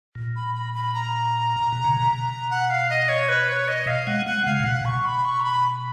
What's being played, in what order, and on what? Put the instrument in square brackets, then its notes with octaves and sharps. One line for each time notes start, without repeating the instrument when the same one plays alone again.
[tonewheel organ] A#2
[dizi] B5
B5
B5
A#5
[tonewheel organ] B2
C#3
B2
[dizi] F#5
F5
D#5
C#5
B4
C#5
D#5
F5
[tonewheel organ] G#3 [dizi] F#5
[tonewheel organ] G#3 [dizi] F#5
[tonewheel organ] C#3 [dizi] F5
[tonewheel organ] A#2
[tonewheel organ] B2 [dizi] F#5
[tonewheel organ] B2 [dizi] C#6
[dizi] B5
C#6
A#5
B5